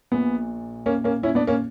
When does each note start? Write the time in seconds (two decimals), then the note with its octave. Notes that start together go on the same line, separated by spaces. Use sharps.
0.12 A#1 A#2 B3
0.86 A#3 C#4
1.04 A#3 C#4
1.23 C#4 E4
1.35 B3 D4
1.47 A#3 C#4